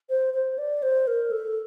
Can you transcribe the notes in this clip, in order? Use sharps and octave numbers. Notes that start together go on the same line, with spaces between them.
C5
C5
D5
C5
A#4
A4